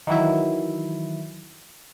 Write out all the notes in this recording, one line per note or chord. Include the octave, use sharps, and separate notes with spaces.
D#3 E3 F#3 E4